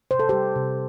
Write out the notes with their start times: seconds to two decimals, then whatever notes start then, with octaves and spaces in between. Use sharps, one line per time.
0.11 C3 C5
0.19 A4
0.29 G3 G4 C5
0.56 C3